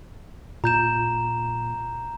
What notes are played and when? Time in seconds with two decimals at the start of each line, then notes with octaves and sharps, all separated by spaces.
0.64 A#2 A#5 G6 E7